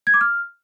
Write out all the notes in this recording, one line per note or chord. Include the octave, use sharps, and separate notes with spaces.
G#6
D6
F6